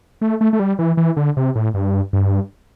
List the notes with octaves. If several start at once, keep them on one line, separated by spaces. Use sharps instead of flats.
A3
A3
A3
G3
E3
E3
D3
C3
A2
G2
G2